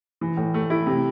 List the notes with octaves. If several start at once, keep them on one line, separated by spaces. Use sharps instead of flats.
E3
A2
A3
E4
C3